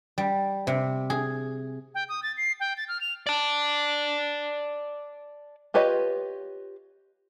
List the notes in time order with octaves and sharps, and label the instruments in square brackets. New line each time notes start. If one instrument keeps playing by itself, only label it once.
[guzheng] G3
C3
G#4
[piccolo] G5
D#6
A6
C7
G5
A6
F6
F7
[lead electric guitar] D5 A5
[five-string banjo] F4 G4 B4 C#5 D#5